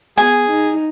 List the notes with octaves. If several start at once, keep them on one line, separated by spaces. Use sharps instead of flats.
B3 G#4 G#5
D#4